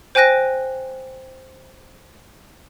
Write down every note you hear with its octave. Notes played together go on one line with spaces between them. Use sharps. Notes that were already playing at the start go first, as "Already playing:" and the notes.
C5 G5 G#5 F#6 A#6 D#7